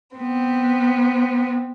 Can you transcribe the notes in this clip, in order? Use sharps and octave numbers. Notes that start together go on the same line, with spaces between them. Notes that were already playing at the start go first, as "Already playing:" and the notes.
B3 C4